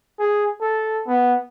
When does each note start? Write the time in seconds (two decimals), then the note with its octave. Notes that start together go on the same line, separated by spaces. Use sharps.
0.19 G#4
0.61 A4
1.07 B3